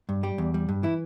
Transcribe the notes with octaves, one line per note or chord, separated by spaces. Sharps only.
G2
G3 G4
E2
G3
G2
E3 E4